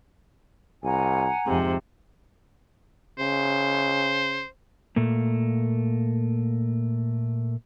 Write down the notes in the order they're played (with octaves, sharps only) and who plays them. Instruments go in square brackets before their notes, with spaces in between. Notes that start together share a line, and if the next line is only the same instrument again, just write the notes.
[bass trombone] C2 [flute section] F#5 G#5 A#5
[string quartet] F2 C3 [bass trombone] G#2
[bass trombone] C#3 [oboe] C5
[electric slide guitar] A#2 A3 A#3